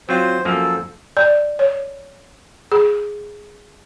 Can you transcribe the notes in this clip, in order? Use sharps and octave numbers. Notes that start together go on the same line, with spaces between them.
F#3 C4 F4 C5
F#2 F3 A#3 A4
D5
C#5
G#4